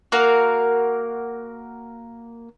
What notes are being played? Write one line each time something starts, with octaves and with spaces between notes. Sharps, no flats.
A#3 F#4 A#4 F5